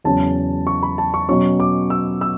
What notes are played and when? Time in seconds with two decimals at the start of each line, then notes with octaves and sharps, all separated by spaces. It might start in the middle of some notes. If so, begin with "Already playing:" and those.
0.04 E2 C#3 F#3 C#4 A5
0.67 C#6
0.83 B5
0.98 A5
1.14 C#6
1.28 B2 F#3 C#4 C#6
1.60 D6
1.90 E6
2.21 E6